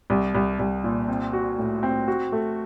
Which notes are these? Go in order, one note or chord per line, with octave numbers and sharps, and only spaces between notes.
C2
C2
C2
A#2
C4
F#4
A2
C4
F#4
A3